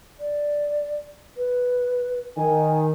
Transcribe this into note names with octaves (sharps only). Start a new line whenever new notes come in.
D5
B4
D#3 G#5